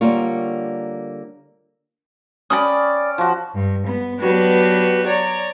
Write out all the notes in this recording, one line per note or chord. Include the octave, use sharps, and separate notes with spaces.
D3 G3 A#3 F4 C#5
C#4 D5 G5 B5 D#6
F3 F#4
G2
B3
F#3 B3 D4 F#4 G4 B4
C#5 D5 A#5